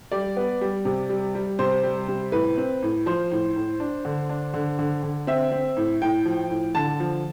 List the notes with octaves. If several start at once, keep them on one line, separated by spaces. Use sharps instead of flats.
G3 D5
B3
G3
C3
G3
G3
C3 C5
G3
C3
A2 B4
C4
A2
F3 C5
A2
A2
D4
D3
D4
D3
D3
D3
C4 E5
C4
A2
A2 G5
F3
A2
D3 A5
F3